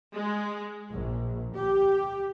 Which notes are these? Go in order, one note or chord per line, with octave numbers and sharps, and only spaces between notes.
G#3
A#1
G4